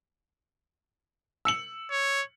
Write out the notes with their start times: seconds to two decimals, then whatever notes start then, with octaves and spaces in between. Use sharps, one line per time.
1.45 E6 C#7 F#7
1.91 C#5